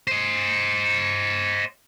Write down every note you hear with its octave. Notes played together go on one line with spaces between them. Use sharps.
C5 D#5